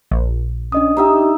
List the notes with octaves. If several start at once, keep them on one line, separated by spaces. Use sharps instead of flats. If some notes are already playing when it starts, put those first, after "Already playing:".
A#1
C#4 D4 D#5 D#6
D#4 G4 E5 G5